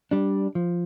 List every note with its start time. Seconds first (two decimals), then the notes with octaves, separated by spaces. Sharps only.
0.11 G3 D4
0.55 F3